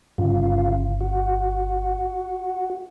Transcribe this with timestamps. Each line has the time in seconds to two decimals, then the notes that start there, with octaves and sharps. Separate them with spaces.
0.18 G1 C#3 F4
1.01 F#4